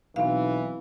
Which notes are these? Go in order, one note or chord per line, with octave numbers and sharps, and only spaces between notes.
B1 E3 C4 F5